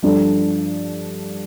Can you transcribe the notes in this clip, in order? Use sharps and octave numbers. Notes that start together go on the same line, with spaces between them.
G2 F3 A3 D4 A4